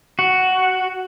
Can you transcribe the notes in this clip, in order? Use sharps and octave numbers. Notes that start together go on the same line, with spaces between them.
F#4